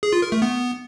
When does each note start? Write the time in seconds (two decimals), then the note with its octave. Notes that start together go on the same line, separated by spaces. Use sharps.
0.03 G#4
0.13 F4
0.22 A#4
0.32 A3
0.42 B3